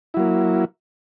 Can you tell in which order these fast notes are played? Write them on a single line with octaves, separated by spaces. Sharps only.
E4 F#3 A#3